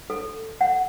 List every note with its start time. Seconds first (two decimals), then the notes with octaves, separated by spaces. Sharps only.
0.10 A4
0.61 F#5